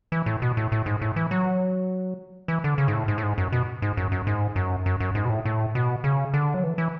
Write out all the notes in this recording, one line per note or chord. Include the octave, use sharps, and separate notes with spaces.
E3
A2
B2
A2
A2
G#2
A2
E3
F#3
E3
D3
C#3
G#2
A2
G#2
A2
G#2
F#2
B2
G#2
F#2
F#2
G#2
F#2
F#2
F#2
G#2
B2
A2
A2
B2
C#3
D3
F#3
E3
E3